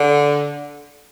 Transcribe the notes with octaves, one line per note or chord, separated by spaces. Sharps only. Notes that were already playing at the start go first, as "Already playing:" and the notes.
Already playing: D3